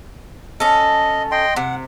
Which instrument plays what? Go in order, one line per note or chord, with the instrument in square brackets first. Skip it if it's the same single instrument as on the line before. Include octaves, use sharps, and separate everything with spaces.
[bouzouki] C#4 A4 [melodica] D#5
[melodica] D#5 G5 C6
[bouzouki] C3 [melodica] F#5